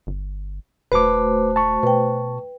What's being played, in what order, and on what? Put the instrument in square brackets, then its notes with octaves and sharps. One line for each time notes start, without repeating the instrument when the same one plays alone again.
[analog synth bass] G1
[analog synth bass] D#1 [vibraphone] A3 F#4 C5 [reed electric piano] B4 D6
[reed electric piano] A5 C#6
[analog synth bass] B2 [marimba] B4 G5